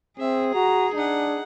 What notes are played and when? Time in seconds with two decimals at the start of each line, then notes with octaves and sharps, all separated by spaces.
0.20 C4 G#4 E5
0.54 F#4 A#5
0.94 D4 D#4 F#5